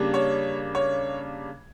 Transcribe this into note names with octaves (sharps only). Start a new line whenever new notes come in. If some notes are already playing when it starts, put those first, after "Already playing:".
Already playing: C#3 G3 A#3 D4
C#5
C#5